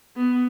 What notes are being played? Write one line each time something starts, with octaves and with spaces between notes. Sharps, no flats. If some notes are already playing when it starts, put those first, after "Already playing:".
B3